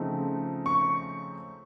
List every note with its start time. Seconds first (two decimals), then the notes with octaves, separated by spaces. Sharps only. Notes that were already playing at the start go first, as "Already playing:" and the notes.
Already playing: C#3 F3 A3 C4 D#4
0.66 C#6